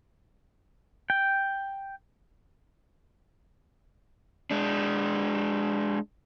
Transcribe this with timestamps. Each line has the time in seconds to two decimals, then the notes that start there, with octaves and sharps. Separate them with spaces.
1.10 G5
4.51 G#3 D4